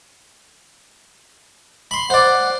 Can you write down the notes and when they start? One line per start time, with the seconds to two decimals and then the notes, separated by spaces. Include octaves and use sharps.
1.91 B5 C6
2.10 C5 D5 F#5